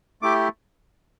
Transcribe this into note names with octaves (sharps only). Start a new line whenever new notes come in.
A3 E4 G4 D6